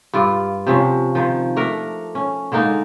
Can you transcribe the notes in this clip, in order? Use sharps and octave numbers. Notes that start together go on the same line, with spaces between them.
G2 F4 D5
C3 F3 C#4
D#3 F3
A3 D4 A#4
C#4
D3 G#3 A#3 D#4